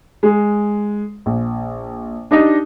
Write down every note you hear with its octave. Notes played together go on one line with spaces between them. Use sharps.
G#3
A#1
D4 D#4 G4 D#5